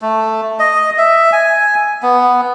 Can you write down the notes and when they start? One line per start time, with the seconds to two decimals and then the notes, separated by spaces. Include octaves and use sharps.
0.02 A3
0.59 D#5
0.98 E5
1.33 G#5
2.02 B3